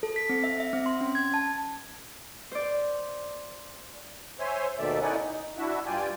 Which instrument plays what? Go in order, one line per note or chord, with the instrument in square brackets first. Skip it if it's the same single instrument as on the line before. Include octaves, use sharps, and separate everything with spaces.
[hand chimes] A4
B6
C4
E5
E5
C4
C6
C#4
G#6
A5
[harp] C5 D5
[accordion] C5 C#5 E5 G#5 C6
D#2 B2 D#3 A3 D5 E5
C#4 D#4 E4 D5 F#5 G#5
D#4
D4 E4 F#4 E5
G2 F4 D5 G5 G#5